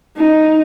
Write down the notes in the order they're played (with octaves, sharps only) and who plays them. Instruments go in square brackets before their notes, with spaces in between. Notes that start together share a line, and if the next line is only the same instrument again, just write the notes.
[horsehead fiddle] D#4